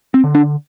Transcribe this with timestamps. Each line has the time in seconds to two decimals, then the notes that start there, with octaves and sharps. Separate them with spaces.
0.14 C4
0.24 D3
0.35 D4